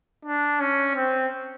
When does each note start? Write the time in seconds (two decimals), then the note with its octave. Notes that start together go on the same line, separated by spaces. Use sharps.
0.25 D4
0.60 C#4
0.96 C4